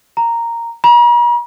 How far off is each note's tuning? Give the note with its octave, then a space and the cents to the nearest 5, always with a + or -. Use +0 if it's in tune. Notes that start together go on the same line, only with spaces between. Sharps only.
A#5 -5
A#5 +45